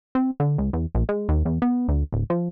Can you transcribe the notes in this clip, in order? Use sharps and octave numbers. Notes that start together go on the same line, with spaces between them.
C4
D3
C#2
E2
A#1
G#3
D#2
E2
B3
D2
D1
F3